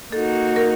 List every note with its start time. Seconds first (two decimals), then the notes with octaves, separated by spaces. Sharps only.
0.12 A#3 D#4 F#4 A4
0.56 A#4